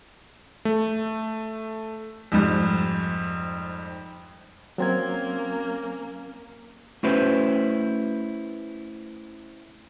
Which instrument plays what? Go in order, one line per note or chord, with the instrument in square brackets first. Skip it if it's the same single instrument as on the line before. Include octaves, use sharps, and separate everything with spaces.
[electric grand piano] A3
[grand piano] F2 G#2 G3
[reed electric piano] F#3 C4 G#6 [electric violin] A#3 C#4
[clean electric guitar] A3 C#4 E4 F#4 B4 C5